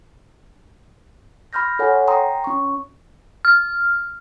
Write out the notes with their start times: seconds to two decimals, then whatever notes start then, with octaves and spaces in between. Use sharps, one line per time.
1.53 B5 C6 F6 G6 A#6
1.79 A4 C#5 F#5 G#5
2.07 G5 A#5 C6 D#6
2.44 C#4 C#6
3.45 F6